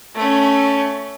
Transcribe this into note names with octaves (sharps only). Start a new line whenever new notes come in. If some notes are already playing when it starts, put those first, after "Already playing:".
A3 C#4